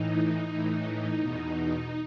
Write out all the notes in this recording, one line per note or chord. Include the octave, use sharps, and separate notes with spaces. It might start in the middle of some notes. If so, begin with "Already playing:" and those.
Already playing: A2 E3 D#4
A2 E3
E2 B2